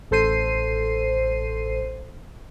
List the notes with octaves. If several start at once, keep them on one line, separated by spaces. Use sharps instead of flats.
A1 A4 C5 C7 D#7